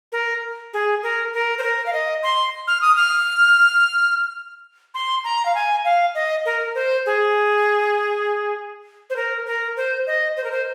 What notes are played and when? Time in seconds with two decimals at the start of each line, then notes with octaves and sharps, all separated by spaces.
0.12 A#4
0.73 G#4
1.03 A#4
1.33 A#4
1.58 C5
1.63 A#4
1.86 F5
1.93 D#5
2.23 C6
2.67 F6
2.81 D#6
2.96 F6
4.94 C6
5.24 A#5
5.46 F5
5.55 G#5
5.85 F5
6.15 D#5
6.46 A#4
6.75 C5
7.06 G#4
9.10 C5
9.16 A#4
9.46 A#4
9.77 C5
10.07 D#5
10.37 C5
10.44 A#4
10.52 C5